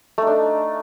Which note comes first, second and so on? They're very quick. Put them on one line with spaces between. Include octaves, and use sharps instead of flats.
A3 D#4 D4